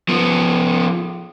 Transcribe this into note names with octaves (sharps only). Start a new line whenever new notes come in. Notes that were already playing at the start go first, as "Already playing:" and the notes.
F3 B3